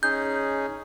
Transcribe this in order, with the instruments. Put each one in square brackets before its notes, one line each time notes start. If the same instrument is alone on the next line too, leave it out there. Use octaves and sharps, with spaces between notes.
[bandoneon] C#4 D#4 G#4 [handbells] G6